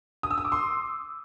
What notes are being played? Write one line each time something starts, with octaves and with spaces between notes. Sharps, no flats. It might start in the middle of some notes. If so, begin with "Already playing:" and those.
D#6
E6
D#6
D6
C6